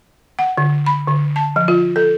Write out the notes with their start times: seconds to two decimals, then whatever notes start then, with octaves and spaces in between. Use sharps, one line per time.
0.39 F#5
0.57 D3
0.86 B5
1.08 D3
1.36 A5
1.56 F3
1.68 F4
1.96 A4